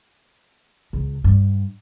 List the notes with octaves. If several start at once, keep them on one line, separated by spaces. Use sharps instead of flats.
C#2
G2